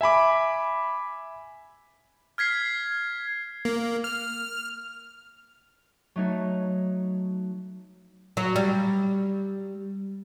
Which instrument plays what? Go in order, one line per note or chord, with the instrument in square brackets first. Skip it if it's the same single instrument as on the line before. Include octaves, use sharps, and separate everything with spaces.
[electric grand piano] E5 G#5 B5 D6
[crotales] F6 G#6 B6 C7
[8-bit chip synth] A#3
F6
[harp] F#3 A3 D#4 C#5
[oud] F#3
G3